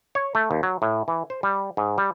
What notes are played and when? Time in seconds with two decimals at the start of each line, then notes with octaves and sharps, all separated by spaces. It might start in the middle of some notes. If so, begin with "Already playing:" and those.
0.15 C#5
0.35 A3
0.51 D#2
0.63 F#3
0.82 A2
1.08 E3
1.30 C5
1.43 G3
1.77 G#2
1.98 G3